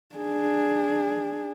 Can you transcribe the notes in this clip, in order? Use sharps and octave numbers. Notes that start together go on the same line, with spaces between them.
D4 G#4